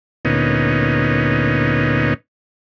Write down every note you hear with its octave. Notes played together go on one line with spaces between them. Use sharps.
D2 A#2 B3 C#4 D#4